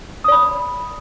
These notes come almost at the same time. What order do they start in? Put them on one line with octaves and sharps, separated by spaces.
D#6 D5 B5